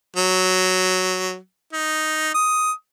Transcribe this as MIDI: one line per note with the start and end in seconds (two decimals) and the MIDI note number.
0.17 1.36 54
1.73 2.34 63
2.34 2.72 87